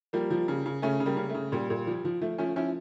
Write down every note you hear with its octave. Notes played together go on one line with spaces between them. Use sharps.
F3 G3 A#3
F3
C#3
C#3
C#3 A3 C#4
C#3
G3 A#3
C#3
C#3 A3
A#2 G3
A#2
F3
F3
F3 A3
F3 A3 C#4
F3 C#4 E4